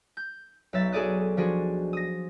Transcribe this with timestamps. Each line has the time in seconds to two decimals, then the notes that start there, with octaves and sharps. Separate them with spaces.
0.17 G6
0.73 B1 F#3 E5 A6 B6
0.92 F#4 G#4 A4 D5 D#6 F#6
1.37 F3 D4 F#4 G#4
1.93 D#6 A#6